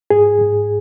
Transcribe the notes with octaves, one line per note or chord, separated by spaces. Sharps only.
G#2 G#4
G#2